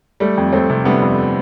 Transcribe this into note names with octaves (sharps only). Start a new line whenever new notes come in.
G3 A3
F2
F2 A3 C4
C3
G3 B3 D4
F2